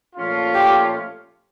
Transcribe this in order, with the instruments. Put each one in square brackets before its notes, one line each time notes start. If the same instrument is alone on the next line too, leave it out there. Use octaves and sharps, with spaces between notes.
[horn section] A#2 F3 A3 C#4 F4
[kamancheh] G4